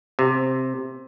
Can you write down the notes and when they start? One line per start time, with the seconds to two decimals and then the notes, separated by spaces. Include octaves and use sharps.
0.19 C3